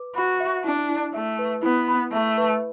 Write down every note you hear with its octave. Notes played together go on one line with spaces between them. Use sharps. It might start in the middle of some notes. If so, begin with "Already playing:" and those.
Already playing: B4 D6
F#4 B5
E5
D4 E4
E4
A3 E5
B4
B3 E4
B5
A3 E5
B4